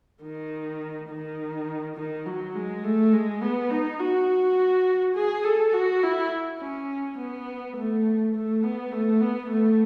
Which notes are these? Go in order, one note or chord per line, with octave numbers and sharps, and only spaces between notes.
D#3
D#3
D#3
F#3
G#3
A3
G#3
B3
D#4
F#4
G#4
A4
F#4
E4
C#4
B3
A3
A3
B3
A3
B3
A3